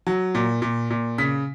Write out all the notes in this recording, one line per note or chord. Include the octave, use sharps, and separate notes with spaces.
F#3
A#2
A#2
A#2
C#3 B6